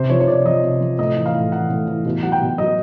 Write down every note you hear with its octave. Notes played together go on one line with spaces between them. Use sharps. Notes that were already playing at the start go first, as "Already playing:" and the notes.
Already playing: C3 C5
F3 C#5
C#5
C3 D5
F3 D#5
C3
F3
A2 D#5
E3
F5
A2
E3 F#5
A2
E3
B2
F#3 F#5
G5
B2
F#3 D#5